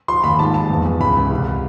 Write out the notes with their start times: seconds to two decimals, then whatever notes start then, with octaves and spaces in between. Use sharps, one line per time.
0.08 F3 C6
0.24 D#2 B5
0.39 G#2 A5
0.54 F3 A5
0.70 E2
0.85 E2
1.00 C#2 B5
1.16 C#2
1.30 C2